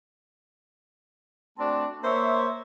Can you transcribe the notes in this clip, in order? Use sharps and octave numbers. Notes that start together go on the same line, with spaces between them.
A3 C4 D4 F#4 A5
A#3 C5 C#5 E5